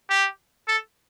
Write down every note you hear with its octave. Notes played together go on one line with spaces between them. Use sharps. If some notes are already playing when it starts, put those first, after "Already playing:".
G4
A4